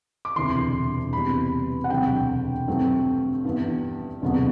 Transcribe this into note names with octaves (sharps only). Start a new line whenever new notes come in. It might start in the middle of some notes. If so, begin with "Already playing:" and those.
D6
E1 D2 C3 E3 C6
E2 C3 G3 B5
F#5
E1 D2 C3 F#3 G5
G2 F#3 A3 C4
G2 E3 B3
E1 D2 C3 F#3 B3